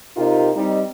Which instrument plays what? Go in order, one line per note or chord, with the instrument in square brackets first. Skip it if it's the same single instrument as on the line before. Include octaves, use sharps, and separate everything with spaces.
[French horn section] C3 D#4 F4 G4 A#4
G3 C4 D#4